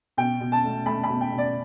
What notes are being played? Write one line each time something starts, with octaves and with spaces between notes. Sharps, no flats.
B2 G5
B2
A5
A3
A3 B5
B5
B2
G5
B2
D5